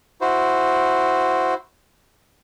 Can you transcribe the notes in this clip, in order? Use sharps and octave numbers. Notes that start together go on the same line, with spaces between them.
E4 F#4 C5